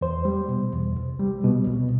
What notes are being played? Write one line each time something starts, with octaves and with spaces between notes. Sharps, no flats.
E2 C5
G3
B2
E2
C2
G3
B2
C2